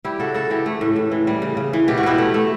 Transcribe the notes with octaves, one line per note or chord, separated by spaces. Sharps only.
G3 E4 G4
C#3 F#4 A4
C#3 F#4 A4
E3 E4 G4
A3
A2
A2
E3
G3
C#3
C#3
E3
B2 G4
F#4
B2 E4 G4
A3
A3